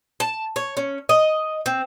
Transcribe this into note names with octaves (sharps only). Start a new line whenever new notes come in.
A5
C#5
C#4
D#5
C4